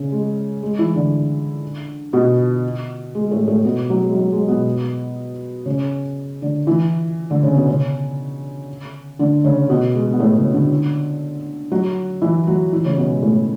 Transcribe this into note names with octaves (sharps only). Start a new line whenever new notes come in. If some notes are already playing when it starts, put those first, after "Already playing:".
Already playing: C#3 C#4
G#3
G#3
E3 E4
D3 D4
B2 B3
G#3
A2 A3
A2 A3
B2 B3
F#3
G#3
F#3
G#3
B2 B3
C#3 C#4
D3 D4
E3 E4
D3 D4
C#3 C#4
B2 B3
C#3 C#4
D3 D4
C#3 C#4
B2 B3
G#3
B3
A2 A3
C#3 C#4
D3 D4
F#3 F#4
E3 E4
F#3 F#4
E3 E4
C#3 C#4
B2 B3
G#3
A2 A3